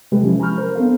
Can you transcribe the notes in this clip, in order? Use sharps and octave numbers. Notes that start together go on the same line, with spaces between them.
C3 F#3 G#3 G4 A4 B4
F3 C#4 E4
G#5 A#5 B5 C#6 F6 G6
A#4 C5 A#5
B3 C4 D4 A4 C5 F5